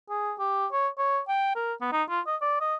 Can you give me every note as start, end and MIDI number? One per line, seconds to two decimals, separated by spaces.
0.10 0.33 68
0.38 0.66 67
0.72 0.88 73
0.98 1.19 73
1.28 1.53 79
1.56 1.73 70
1.81 1.88 59
1.92 2.03 63
2.09 2.20 65
2.27 2.36 75
2.41 2.56 74
2.60 2.75 75